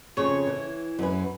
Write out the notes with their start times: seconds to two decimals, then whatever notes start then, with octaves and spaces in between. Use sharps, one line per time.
0.17 F2 C#3 C#5
0.47 E3
0.99 F#2 B4